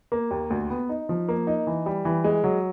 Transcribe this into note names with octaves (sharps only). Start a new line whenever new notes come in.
A#3
D#2
D2
B3
D#4
F3
A#3
D#4
E3
G3
E3
G#3
F#3